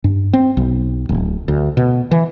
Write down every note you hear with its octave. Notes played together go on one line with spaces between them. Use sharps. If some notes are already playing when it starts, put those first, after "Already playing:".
G2
C4
B1
D1
D2
B2
E3